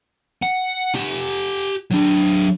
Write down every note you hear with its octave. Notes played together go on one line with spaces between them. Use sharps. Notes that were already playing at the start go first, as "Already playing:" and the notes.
F#5
G4 F#5
F#3 D4